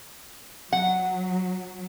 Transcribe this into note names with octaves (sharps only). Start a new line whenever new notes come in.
F#3 F#5